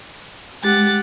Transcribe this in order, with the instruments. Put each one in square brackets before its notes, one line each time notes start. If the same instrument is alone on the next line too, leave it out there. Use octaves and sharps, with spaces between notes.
[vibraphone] G#3 [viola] G4 F#5 [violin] A6